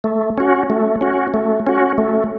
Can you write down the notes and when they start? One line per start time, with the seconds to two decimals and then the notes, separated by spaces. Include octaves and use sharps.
0.04 A3
0.38 C#4 F#4
0.70 A3
1.01 C#4 F#4
1.34 A3
1.67 C#4 F#4
1.98 A3